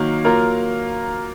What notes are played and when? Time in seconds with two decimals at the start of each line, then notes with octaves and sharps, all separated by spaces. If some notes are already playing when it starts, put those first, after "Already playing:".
Already playing: D#3 F#3 A#3
0.25 F#3 A#3 F4 A#4